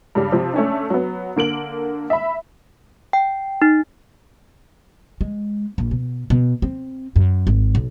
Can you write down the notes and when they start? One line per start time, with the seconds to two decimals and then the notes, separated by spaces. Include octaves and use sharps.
0.15 G2 C#3 G3
0.32 C3 F3
0.54 A3 C#4 D4
0.90 F#3 B3
1.36 D3 A#3 D7 F#7
2.10 E5 B5
3.13 G5
3.62 D#4
5.21 G#3
5.78 A#1
5.91 B2
6.30 B2
6.62 C4
7.16 F#2
7.47 G#1
7.75 B1